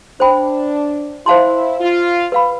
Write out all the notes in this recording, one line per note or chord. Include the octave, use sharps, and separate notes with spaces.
D4 C5 G5 B5
E4 C5 F5 A5 C6
F4
B4 F5 B5